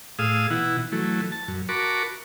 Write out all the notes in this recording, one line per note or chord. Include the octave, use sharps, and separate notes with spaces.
A2 G#4 F5 D#6 E6
B2 E3 E4 F#5
E3 F#3 A3
A5
F#2
F#4 A#4 A5 B5 C#6 D6